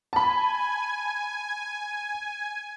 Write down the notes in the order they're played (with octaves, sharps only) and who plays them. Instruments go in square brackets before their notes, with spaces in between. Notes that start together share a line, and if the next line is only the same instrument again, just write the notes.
[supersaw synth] G#5 [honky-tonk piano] A5 B5